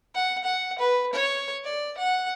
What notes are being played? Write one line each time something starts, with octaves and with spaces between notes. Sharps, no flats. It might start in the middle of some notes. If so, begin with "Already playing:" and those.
F#5
F#5
B4
C#5
D5
F#5